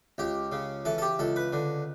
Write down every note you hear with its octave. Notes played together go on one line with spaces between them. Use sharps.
C#2 G4
C#3
E3 A4
A4
G4
C#2 A4
B4
D3